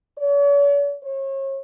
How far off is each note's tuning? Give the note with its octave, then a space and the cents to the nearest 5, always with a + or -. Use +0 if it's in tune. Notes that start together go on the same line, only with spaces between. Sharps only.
C#5 +45
C#5 -35